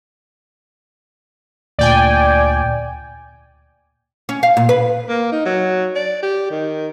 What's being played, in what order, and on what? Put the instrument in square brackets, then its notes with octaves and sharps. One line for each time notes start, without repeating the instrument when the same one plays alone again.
[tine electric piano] D2 A#2 [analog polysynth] D5 G5 G#5
[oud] C#4
F5
A#2
B4
[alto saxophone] A#3
D#4
F#3
D5
G4
D#3